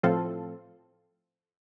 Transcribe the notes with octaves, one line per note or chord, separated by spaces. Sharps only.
A2 F3 C4 F4 A4